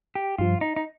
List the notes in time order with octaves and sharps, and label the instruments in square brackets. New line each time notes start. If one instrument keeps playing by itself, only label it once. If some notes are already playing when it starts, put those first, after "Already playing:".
[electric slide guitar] G4
[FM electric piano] G2 F3 [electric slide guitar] F4
[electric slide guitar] D#4
D#4